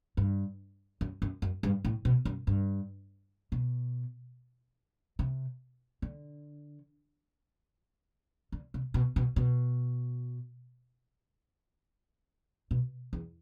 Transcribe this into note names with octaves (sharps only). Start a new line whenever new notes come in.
G2
F#2
F#2
F#2
G2
A2
B2
F#2
G2
B2
C3
D3
D3
C3
B2
B2
B2
B2
E2